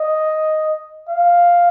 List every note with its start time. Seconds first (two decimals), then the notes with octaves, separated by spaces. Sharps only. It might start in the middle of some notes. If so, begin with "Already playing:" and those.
Already playing: D#5
1.10 F5